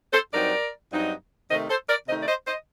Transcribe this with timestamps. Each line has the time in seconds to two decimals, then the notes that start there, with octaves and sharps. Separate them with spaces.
0.12 A4 C5
0.32 G2 F#3 C4 D#4 A#4 D5
0.91 G2 F#3 C4 D#4
1.49 C3 D#3 A3 D#4 C5 D#5
1.68 A4 C5
1.88 A#4 D5
2.07 C3 D#3 A3 D#4 C5 D#5
2.22 D5
2.27 C5 D#5
2.46 C5 D#5